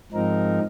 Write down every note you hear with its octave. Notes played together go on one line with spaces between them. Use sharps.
G#2 F3 C4 D#4 A#4